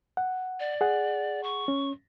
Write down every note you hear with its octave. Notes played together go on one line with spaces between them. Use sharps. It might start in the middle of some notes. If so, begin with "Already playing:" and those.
F#5
D5
G#4 F#5
C#6
C#4